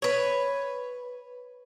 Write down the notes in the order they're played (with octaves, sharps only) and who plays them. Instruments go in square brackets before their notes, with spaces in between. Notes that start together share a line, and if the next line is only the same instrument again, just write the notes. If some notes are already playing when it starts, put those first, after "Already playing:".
[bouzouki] B4 C#5